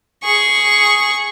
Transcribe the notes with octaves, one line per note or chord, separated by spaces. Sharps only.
G#4 C#6